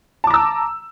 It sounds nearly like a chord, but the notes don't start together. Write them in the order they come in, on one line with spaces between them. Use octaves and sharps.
A5 D6 A#5 E6